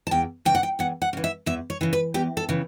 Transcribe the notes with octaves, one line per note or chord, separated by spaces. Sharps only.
A5
E2 G5
C#3 E3 G5
F#5
G5
E2 F#5
F#5
C#3 E3
E5
E2 E5
C#5
C#3 E3
B4
E2 G4
A4
C#3 E3